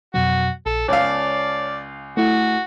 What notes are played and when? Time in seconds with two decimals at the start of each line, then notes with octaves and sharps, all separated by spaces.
0.14 F2 B2 F#3 F#4
0.66 A#1 A4
0.88 C#2 C#5 D5 F5 A5
2.17 A3 E4 F#4